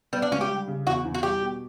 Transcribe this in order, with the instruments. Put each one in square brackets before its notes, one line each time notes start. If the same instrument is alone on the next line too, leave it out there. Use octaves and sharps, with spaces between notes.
[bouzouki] G3 [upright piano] B3
[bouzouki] D4
[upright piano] C#2 [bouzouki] C#4
[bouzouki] G4
[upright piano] G3
C#3
[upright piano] E2 [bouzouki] F#4
[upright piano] E2
[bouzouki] F#4
[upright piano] G3 [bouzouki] G4
[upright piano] B2